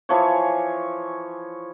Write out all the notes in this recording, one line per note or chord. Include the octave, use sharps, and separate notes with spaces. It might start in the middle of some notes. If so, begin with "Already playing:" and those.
E3 F3 C#5